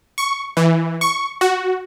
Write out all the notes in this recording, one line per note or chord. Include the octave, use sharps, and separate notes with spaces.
C#6
E3
C#6
F#4